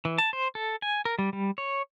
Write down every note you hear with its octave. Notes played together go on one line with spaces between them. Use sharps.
E3
A5
C5
A4
G#5
A#4
G3
G3
C#5